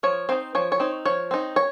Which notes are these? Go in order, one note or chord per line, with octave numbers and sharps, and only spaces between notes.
F3 C#5
C4 D#4 C5
F3 C#5
C#5
C4 D#4
F3 C#5
C4 D#4
C#5